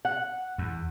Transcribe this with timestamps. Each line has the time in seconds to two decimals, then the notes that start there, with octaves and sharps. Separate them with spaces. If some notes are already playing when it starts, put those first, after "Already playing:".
0.05 F#5
0.58 E2